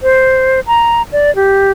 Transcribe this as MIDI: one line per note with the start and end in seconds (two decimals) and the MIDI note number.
0.03 0.60 72
0.67 1.02 82
1.12 1.34 74
1.36 1.72 67